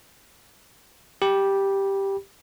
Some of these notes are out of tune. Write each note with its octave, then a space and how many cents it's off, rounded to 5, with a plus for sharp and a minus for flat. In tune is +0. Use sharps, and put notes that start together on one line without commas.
G4 +0 B5 -25